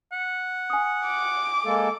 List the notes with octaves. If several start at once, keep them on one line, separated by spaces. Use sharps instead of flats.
F#5
G#5 D#6
D6
G#3 A#3 A4